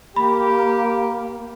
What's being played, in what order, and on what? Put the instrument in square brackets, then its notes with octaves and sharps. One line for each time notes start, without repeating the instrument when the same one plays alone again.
[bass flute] A#3 [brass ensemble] G4 [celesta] B5